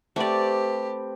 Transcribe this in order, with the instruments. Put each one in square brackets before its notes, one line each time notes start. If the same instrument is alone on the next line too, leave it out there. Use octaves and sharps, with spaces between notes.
[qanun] A3 D5 [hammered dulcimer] C4 B4 [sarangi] G4